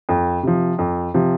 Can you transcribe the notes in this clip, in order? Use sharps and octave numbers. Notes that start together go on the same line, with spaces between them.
F2
C3 F3
F2
C3 F3